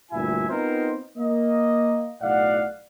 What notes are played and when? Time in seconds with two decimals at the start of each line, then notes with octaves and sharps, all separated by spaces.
0.12 D2 G2 A#2 E4 E5 G#5
0.50 B3 C4 D#4 F4 A#4 C5
1.17 A#3 D#5
2.21 B1 A2 D5 F5 F#5